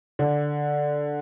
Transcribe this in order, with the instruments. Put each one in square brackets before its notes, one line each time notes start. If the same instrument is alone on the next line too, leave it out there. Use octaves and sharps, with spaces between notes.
[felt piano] D3